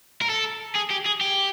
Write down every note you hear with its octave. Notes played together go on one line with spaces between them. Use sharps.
A#4
A4
G#4
G4
G#4
G4